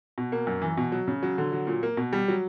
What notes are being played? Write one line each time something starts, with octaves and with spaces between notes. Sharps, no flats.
B2
A#3
F#2
E3
B2
F#3
C#3
F#3
D3
F#3
A#2
A#3
B2
G3
F#3